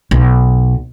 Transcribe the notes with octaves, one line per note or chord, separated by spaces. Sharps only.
B1